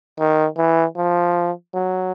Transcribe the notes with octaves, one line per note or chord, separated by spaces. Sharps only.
D#3
E3
F3
F#3